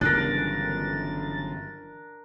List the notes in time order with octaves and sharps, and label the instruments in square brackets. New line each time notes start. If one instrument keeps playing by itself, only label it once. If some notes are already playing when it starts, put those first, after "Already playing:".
[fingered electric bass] G1 [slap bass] C#3 E3 F#3 [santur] D4 A#4 [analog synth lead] A6